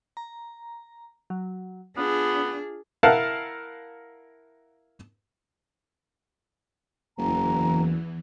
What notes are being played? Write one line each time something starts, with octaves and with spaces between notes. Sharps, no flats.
A#5
F#3
B3 D4 F4 G#4
E4 A#4 F5 F#5 A5
F#1 E2 E3 A#5